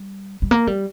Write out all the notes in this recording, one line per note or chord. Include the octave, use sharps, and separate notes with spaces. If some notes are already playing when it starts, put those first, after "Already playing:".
Already playing: G3
G3
A#3
G3